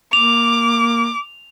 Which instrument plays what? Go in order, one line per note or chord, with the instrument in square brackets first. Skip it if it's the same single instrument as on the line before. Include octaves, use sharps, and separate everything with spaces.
[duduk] A#3 [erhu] D6 [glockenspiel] F7